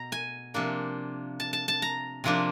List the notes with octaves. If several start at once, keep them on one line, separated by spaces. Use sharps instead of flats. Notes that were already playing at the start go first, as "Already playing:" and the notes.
Already playing: B2 A#5
G#5
C3 F3 A#3 D4
A5
A5
A5
A#5
C3 F3 A#3 D4